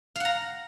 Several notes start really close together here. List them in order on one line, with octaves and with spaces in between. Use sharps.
F5 F#5 A#5